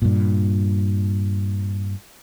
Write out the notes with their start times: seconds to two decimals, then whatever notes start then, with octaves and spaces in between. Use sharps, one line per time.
0.02 G2 A#2